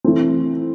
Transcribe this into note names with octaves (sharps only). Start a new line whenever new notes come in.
E3 A3 C4